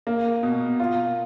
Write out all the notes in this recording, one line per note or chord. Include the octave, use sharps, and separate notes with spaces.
A#3
B2
F4